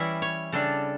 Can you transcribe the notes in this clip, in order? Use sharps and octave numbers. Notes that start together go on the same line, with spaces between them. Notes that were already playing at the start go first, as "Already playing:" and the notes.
Already playing: E3 G3 C#4 E4 E5
C#5
C#3 G3 D4 A4